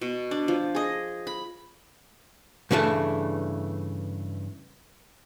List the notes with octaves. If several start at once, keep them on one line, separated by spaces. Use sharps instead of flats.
B2
D4
F3
G#4 D#5
B5
G2 C#3 E3 G#3 A3